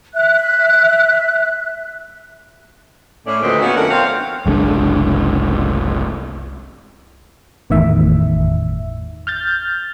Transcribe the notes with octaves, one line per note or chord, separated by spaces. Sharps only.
E5 F#6
A2 C#4 D5
D2 A#2 D#3 G#3 C4 B4
B3 C#4 D#4 E4 F#4
F2 D3 A3 A#4 F#5
C4 C#5 F5
F#1 C2 G#3 D4
G1 E2 A2 D#3 E5
F6 G6 A6